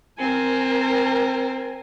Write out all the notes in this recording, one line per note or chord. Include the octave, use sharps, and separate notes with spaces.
C4 A#4 G#5